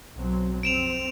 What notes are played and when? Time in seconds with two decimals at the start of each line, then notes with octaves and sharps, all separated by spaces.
0.16 B1 F#3 C4
0.63 F2 C4 D7 E7 F7